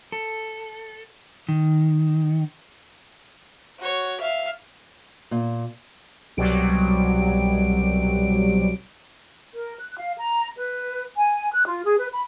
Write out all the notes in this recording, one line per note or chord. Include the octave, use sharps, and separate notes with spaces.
A4
D#3
F#4 C#5
E5 F5
A#2
C2 B2 F#3 G3 D7
A#4
F#6
F5
A#5
B4
G#5
F#6
F4
G#4
B4
B5